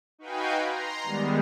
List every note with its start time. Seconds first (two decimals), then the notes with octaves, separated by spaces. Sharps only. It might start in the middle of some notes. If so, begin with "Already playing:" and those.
0.19 D#4 F#4 B4 F5 G5 G#5
0.62 A#5 C6
1.03 D#3 G3 G#3 B3